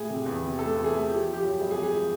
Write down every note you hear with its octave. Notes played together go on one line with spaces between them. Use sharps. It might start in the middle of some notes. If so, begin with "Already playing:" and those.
Already playing: A2 G#4
C3
E2
C3
A3 A4
E2
G#4
A3
F3 G4
F3
G4
F#2
G#1 G#4
G#4
G#1
G#4
F3